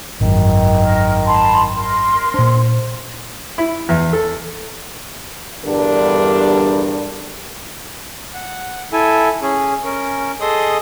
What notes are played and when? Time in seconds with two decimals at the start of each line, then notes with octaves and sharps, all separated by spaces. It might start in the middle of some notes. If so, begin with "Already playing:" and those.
0.21 G#1 F#2 D#3
0.79 A#4
1.26 A5 B5 C6
1.74 A#4 C6
2.34 A#2 D4 C5
3.58 E4
3.89 E2
4.13 A4
5.65 E2 G2 D3 G3 D4 A#4
8.34 F#5
8.92 E4 A4 G#5
9.42 C#4 G#4
9.84 C#4 A#4
10.41 G#4 A4 D#5 C6 D#6